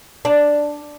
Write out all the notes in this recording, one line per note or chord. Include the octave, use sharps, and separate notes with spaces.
D4